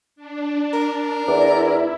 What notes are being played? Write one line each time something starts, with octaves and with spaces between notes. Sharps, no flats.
D4
A#4
E2 E4 D5